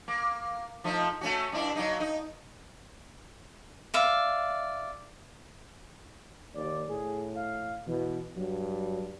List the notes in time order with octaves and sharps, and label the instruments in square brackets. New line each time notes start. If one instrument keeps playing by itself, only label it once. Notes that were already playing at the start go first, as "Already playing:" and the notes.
[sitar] A#3
F3 A3 D#4
A3 C#4 F#4
G2 D4 E4
F#3 A#3 D#4
D#4
[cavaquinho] D5 E5 F5
[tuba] D#2 [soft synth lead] D5
[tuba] A2 [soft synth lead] G#4
[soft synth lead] F5
[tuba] B2 [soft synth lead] E3
[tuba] G2 [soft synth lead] F#3